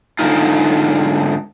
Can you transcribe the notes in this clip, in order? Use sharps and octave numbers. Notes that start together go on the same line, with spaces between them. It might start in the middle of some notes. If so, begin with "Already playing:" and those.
G#2 D3 D#3 G#3 D#4 F4